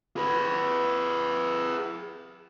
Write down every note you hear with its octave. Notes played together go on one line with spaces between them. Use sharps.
G#4 B4